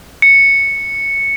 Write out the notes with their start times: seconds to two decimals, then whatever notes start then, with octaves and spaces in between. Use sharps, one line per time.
0.22 C#7